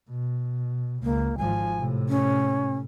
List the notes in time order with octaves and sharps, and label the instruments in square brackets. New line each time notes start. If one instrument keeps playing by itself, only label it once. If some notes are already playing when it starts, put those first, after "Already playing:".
[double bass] B2
[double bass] C#2 [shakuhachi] A#3
[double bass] G#1 F3 [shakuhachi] G#5
[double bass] A2 C3
[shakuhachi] C#4